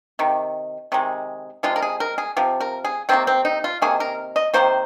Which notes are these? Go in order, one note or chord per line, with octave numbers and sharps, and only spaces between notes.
C3 D#3
C3 D#3 G#3
C3 F3 G#3 F4
A#4
G#4
A#4
G#4
C3 F3
A#4
G#4
C3 D#3 A#3 C4
C4
D#4
F4
C3 D#3 A#3 G#4
A#4
D#5
C3 D#3 A#3 C5